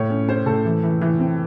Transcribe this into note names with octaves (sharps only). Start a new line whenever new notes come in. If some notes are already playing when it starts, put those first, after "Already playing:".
Already playing: A2 C#5
C#4
C#4 C5
A2 A4
E3
E3
E3
C4